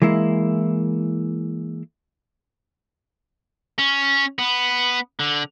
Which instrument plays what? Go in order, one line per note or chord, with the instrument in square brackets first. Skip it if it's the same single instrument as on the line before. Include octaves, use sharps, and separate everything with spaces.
[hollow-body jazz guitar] E3 G#3 A#3 E4
[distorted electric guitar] C#4
B3
D3